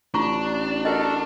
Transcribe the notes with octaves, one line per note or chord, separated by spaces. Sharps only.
A1 D4 F4 A#5 C#6
F#4 A4 A#4 D#5